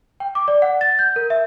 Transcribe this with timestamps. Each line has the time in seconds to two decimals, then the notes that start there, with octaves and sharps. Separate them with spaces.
0.20 G5
0.35 D6
0.48 D5
0.62 F#5
0.81 A6
0.99 G6
1.16 A#4
1.30 E5